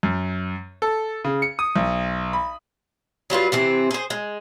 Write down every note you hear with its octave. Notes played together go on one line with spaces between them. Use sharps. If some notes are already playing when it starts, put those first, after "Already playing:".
F#2
A4
C#3
C#7
D#6
B1
B5
F#3 G3 F4 B4
C3 E3 C4
G#4 C5
G#3